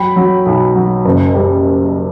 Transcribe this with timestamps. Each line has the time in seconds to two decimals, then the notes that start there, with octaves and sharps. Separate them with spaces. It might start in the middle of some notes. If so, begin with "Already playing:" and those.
Already playing: F#3 G5 B5
0.16 F#3
0.46 B1
0.75 F#3
1.05 F#1
1.34 G3